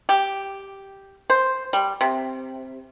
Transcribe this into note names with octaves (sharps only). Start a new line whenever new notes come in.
G4
C5
G3
C3